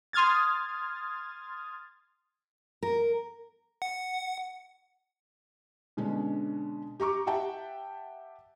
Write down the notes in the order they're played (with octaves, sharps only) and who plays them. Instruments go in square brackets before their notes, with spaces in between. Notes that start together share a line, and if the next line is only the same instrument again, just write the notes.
[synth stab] C6 D#6 F6 G#6 A6
[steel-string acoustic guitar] A#4
[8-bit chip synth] F#5
[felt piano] B2 D3 G#3 C#4 D4
G4 A#5 C#6 D6
G4 E5 F#5 G5 A5